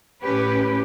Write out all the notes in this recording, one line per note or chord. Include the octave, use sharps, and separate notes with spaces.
A2 C#4 G4 B4